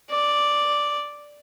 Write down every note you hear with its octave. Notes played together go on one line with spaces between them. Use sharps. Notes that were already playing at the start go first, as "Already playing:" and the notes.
D5